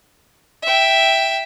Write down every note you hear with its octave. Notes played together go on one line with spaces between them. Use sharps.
E5 G5